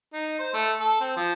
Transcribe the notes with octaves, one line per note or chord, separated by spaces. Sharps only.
D#4
C5
A3
A4
C4
F3